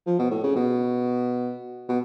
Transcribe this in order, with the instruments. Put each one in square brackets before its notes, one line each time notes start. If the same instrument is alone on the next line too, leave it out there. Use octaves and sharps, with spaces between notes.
[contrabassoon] F3
B2
A2
C#3
B2
B2